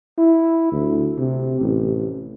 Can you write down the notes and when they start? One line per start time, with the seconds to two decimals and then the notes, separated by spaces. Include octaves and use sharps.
0.18 E4
0.72 D2
1.19 C3
1.61 A1